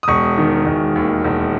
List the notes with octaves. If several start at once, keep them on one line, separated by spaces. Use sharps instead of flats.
D#6
E1 C#6
D#3
E1
D#2
E1